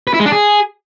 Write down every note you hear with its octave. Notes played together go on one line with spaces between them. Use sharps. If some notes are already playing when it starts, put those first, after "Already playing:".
B4
E4
G#3
D4
G#4